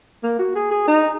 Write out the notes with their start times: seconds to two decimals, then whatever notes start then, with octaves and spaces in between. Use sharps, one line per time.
0.23 A#3
0.39 F#4
0.56 G#4
0.71 G#4
0.88 D#4